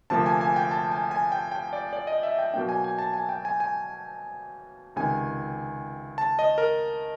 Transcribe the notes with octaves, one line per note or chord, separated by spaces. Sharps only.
D2 C3 F3 A#3 A5
G#5
G#5
G5
A5
G#5
G#5
G5
G5
D5
D5
D#5
E5
G5
B2 F#3 A#3 D4 G5
G#5
G#5
A5
G#5
G5
G#5
G#5
C#2 C3 D#3 G#5
A5
D#5
A#4